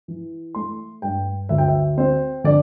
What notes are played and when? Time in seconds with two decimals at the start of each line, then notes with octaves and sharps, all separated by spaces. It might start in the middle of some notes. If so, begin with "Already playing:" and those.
0.08 E3
0.55 A3 C6
1.02 G2 G5
1.49 D2 E5
1.58 G5
1.68 E5
1.97 C4 C5
2.44 D3 D5